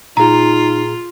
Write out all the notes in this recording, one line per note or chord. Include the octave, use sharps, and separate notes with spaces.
A#2 D#4 F4 G#4 A#5